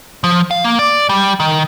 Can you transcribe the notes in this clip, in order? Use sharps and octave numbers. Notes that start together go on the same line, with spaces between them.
F3
F5
A#3
D5
G3
D#3